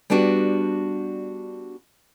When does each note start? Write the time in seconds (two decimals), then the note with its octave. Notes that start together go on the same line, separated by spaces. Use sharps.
0.10 G3 B3 D4 F#4 G4